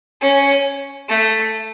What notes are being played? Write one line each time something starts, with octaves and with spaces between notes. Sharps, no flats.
C#4
A3